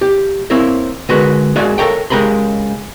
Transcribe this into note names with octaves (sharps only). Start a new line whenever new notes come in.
G4
A#3 C4 E4 A#4 C#5
D3 G#3 F#4 A#4 B4
G#3 A#3 F#4 G#4 D5
A4 A#4 C#5 G5
C#2 G#3 G4 A#4 B5 C6